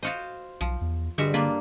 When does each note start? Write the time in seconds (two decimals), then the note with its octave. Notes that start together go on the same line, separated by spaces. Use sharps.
0.03 F4 F#4 C5 D#5 F5
0.61 B1 F3
0.81 E2
1.18 G2 D3 G#3 F#4 E5
1.34 A#3 D4 F4 B4